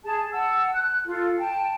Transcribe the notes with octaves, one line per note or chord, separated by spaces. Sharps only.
G#4 A5
F#5 A5 E6
F#6
F4 A4
G5 A5